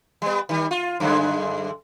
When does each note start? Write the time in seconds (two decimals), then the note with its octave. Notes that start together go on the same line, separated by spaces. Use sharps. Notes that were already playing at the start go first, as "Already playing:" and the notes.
0.22 G3 B3
0.49 D#3 G3
0.71 F4
1.00 F#2 D3 G#3